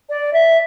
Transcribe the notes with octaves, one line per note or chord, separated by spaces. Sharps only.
D5
E5